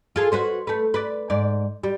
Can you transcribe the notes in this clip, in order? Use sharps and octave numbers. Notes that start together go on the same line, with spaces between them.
F4 G#4 A4
F#4 B4 C5
A3 B4
B4 D5
G#2 D5
G3